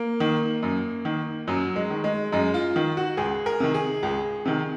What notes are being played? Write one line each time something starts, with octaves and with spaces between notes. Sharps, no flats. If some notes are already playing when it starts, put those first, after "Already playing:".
Already playing: A#3
D#3
F#2
D#3
F#2 F#3
G#3
D#3
G#3
F#2 G#3
F4
D#3
F#4
C#2 G#4
A#4
C3 D#3
G#4
C#2
C3 D#3